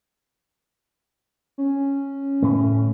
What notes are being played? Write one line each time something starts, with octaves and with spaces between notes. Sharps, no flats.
C#4
A2 A3